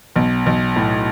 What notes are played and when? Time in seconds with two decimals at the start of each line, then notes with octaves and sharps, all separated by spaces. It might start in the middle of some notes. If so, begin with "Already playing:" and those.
0.16 B1
0.46 B1
0.76 A2